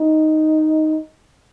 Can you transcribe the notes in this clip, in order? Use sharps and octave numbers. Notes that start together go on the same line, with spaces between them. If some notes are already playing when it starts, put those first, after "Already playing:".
Already playing: D#4